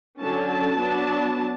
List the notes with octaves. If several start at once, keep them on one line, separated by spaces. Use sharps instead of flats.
D3 F#3 C#4 A5
A5
F#3 B3 D4